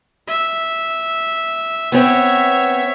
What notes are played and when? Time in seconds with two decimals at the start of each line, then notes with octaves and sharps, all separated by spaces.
0.27 E5
1.92 B3 C4 C#5 E5